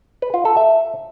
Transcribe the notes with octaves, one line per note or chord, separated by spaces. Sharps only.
B4
F4
A4
E5